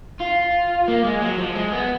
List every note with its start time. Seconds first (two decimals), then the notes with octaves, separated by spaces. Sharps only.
0.21 F4
0.88 A#3
1.04 G#3
1.22 F#3
1.38 F3
1.55 G#3
1.72 B3